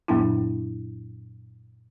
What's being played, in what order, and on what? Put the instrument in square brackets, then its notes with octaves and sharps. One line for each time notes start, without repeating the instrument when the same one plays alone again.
[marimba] F#2 A#2 F#3 B3 D4 E4